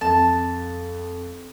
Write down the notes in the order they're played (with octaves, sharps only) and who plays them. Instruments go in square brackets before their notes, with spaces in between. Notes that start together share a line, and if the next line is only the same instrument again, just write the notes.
[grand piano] F2 [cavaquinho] A5